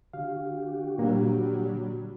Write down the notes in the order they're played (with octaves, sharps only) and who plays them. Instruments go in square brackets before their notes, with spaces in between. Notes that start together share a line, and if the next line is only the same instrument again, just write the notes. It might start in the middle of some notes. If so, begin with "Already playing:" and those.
[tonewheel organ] D3 F#4 G4 [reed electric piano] F5
[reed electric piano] A#2 A#3 D4 [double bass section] F#3 G3